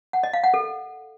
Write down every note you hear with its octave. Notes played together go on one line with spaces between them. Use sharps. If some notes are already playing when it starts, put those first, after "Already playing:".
F#5
D#5
F5
F#5
A4